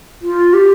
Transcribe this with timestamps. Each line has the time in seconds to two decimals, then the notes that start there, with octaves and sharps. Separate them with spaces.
0.22 F4
0.54 G4